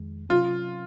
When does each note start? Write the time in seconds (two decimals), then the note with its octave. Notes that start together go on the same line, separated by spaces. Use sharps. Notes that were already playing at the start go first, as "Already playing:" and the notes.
Already playing: F2 D#3 G#3
0.29 C3 F#3 C#4 F4